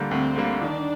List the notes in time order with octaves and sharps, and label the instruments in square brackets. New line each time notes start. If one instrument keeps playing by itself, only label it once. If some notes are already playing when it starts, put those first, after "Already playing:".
Already playing: [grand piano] D2 D3 G3 A#3
[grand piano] D2 [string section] C4
[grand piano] D3 G3 A#3
[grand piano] D#3 [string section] D4